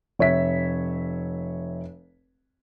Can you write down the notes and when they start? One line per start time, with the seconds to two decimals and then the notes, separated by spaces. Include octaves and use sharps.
0.19 F1 C#5 E5 B6